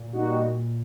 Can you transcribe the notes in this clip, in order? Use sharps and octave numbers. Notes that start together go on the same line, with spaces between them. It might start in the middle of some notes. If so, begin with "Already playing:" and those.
Already playing: A#2
G3 A#3 D#4 F#4
A#2